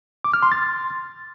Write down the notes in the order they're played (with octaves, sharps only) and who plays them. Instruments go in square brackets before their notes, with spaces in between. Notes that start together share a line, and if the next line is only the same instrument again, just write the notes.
[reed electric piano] D6
F6
C6
A6